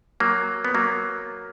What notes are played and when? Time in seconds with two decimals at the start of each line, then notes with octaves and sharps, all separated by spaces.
0.20 F#3 A#3
0.65 B3
0.75 F#3 A#3